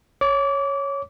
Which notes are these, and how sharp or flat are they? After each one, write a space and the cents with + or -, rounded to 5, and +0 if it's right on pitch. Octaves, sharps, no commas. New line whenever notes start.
C#5 +0 D6 -25